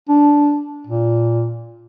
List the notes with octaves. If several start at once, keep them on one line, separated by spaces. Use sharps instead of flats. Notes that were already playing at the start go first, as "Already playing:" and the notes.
D4
A#2